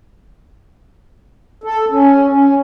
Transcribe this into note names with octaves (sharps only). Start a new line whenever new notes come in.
A4
C#4
C#4